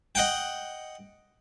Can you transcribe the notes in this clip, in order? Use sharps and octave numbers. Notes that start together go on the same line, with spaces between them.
D#5 F#5 G5